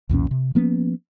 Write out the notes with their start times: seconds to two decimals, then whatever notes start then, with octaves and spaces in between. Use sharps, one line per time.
0.09 B1 E2 A#2 C#4
0.31 C3
0.55 F3 A#3 B3 C#4